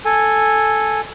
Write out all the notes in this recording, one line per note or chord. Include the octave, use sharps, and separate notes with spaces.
A4 G#5